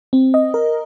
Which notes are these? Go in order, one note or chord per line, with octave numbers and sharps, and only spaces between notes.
C4
D#5
A#4